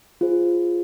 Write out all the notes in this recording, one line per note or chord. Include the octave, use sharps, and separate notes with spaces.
F4 G#4 C5